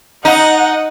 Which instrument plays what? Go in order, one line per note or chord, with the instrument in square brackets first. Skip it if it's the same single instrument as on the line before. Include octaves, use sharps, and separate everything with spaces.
[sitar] D#4 [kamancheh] D#5 F#5